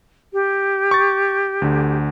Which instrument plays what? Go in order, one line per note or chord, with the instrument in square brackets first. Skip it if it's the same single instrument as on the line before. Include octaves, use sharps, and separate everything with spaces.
[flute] G4
[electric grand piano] C#6 A6
D2 D3